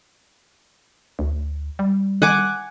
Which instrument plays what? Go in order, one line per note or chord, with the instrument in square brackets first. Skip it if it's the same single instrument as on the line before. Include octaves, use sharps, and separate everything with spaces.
[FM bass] D2
G3
[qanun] F#5 G#5 D6